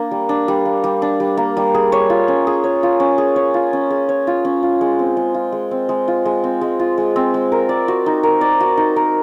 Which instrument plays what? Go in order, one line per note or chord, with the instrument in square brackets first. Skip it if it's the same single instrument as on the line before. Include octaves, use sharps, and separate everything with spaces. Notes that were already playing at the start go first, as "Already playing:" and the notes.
Already playing: [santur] A#3 D4
G3
D4
G3
A#3
G3
D4
G3
A#3
G3
G#4
C#5
F4
C#4
G#4
C#5
F4
C#4
G#4
C#5
F4
C#4
G#4
C#5
F4
C#4
F4
G#3
C4
G#3
F4
G#3
C4
G#3
F4
G#3
C4
G#3
F4
G#3
C4
G#3
A#4
D5
F#4
D#4
A#4
D5
F#4
D#4
A#4